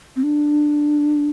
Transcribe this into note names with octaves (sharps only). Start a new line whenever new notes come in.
C4
D4